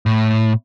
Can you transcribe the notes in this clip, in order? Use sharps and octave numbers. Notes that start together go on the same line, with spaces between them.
A2